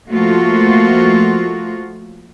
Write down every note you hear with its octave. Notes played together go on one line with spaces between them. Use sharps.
F3 A3 A#3 F4 F#4